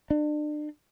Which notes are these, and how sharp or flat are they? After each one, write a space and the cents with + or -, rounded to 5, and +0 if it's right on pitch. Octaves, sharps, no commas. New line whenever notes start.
D4 +35